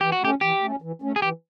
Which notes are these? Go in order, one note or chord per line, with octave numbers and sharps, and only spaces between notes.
E3 G4
F#4
A3 C#4 G4
E3 G4
A3 C#4
E3
A3 C#4
G#4
E3 G4